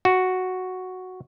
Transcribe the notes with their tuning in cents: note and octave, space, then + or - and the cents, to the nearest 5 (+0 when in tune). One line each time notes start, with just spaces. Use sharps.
F#4 +0